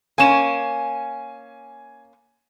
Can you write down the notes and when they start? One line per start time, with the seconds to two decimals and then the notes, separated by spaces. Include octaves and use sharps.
0.18 A#3 C#4 G#5 E7